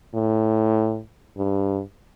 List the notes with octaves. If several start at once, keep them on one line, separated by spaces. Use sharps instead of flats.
A2
G2